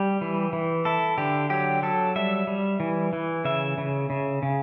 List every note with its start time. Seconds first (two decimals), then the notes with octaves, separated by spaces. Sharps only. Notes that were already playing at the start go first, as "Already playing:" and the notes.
Already playing: G3 G4
0.21 E3
0.53 E3
0.85 E4 A4
1.18 D3 G4
1.50 F#3 G4
1.82 F#3 A4
2.16 G3 E5
2.47 G3
2.80 E3
3.13 E3
3.45 C#3 E5
3.78 C#3
4.10 C#3
4.43 C#3